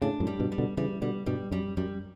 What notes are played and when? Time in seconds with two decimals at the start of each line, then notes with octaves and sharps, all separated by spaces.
0.02 A2 C#3 D4
0.20 F#2 A2
0.27 G3
0.40 G2 B2
0.52 G3
0.58 B2 D3
0.77 C#3 E3 G3
1.02 B2 D3 G3
1.26 G2 B2 G3
1.51 F#2 G3
1.77 F#2 G3